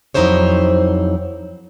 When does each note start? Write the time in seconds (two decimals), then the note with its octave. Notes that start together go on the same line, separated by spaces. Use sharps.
0.14 F2 F#3 D#4 E4 C5 C#5